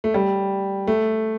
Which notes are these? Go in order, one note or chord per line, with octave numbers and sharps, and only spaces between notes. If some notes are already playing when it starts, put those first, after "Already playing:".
A3
G3
A3